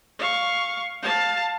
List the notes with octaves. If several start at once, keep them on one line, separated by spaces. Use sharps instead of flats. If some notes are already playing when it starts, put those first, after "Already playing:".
F5 C#6
F5 A5